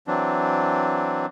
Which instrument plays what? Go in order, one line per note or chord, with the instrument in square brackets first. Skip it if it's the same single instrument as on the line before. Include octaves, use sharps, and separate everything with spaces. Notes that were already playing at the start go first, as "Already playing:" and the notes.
[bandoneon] E3 F#3 C4 D4